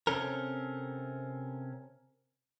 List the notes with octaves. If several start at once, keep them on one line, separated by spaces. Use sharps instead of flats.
C3 C4 C#4 A4 A#4